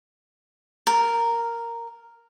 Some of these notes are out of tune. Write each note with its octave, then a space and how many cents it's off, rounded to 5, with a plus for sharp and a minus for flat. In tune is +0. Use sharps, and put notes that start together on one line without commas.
A#4 -5